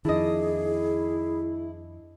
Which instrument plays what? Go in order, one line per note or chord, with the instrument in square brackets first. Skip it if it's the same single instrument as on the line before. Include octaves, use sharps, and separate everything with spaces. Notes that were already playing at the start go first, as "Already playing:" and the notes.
[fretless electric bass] F2 D#3 [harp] D4 D#5 [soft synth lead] E4 [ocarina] G#4